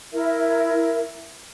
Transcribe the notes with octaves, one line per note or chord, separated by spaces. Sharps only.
E4 A#4 E5